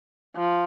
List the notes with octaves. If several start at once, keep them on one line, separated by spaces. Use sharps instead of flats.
F3